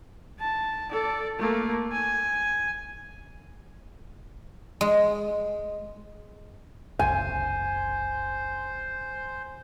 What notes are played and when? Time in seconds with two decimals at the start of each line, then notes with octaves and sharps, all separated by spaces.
0.40 A5
0.92 A4 D5
1.39 A3 A#3
1.92 G#5
4.81 G#3
6.99 F#1 C2 C5 G#5